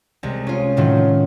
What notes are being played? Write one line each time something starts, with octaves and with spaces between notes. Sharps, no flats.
C2 G#3
C#4 F4
A2 D#3 F#3 F4